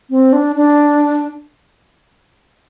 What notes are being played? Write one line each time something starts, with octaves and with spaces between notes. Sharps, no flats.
C4
D4
D4